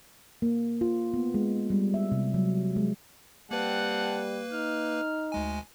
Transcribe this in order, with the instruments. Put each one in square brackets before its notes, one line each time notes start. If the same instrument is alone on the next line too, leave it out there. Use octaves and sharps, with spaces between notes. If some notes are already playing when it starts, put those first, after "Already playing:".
[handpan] A#3
F4
B3
G#3
G3
E5
C3
F#3
G#3
[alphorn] G3 [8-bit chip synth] A#3 B4 [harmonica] C4 F#5 A5
[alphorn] D#4 [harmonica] F6
[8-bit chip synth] D2 G#3 G#5